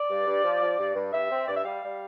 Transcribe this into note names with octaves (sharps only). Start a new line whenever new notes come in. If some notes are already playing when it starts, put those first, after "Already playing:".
Already playing: D5
G2
G2
F3
F3
G2
G2
G2 E5
C4
G2 D5
E5
G3 F5
G3